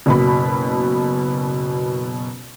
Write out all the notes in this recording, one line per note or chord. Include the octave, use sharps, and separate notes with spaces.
F#1 B2 B5